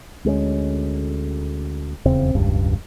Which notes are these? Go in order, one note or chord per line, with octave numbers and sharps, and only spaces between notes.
D2 G#3 A#3 C#4
D#1 E2 C#3 C4
E1 C#2 G2